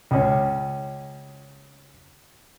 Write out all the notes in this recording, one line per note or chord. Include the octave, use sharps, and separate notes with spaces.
C#2 C#4